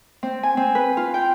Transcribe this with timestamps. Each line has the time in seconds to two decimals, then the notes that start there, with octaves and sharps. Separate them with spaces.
0.23 C4
0.43 G#5
0.57 C4
0.75 B4
0.97 F4
1.14 G5